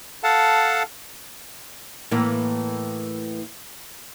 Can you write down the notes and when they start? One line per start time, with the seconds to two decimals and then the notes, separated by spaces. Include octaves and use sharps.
0.24 A4 F5 F#5 A5
2.11 A2 E3 A#3